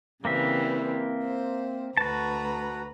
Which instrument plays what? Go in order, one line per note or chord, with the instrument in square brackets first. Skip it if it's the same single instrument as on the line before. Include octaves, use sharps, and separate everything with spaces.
[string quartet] C#3 E3 G3 [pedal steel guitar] A#3 C4 E5
[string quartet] C5
[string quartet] D2 B4 A#5 [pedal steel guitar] F#4 A5